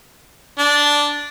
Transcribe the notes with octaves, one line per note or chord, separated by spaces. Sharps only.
D4